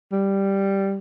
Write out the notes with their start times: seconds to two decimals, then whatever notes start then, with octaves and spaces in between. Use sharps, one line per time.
0.12 G3